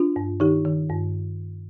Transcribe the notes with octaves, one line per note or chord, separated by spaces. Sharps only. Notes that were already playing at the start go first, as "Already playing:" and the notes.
Already playing: D4 F4
G2
D#3 D#4 G4
D#3
G2